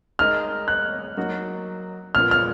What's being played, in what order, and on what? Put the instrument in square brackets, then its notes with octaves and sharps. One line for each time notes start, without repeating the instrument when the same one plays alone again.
[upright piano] G#3 D#4 A#4 D#5 [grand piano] F6
[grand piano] F#6
[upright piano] F#3 A#3 D#4 F#4
[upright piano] A#2 F3 B3 F4 [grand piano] F6
[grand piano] F6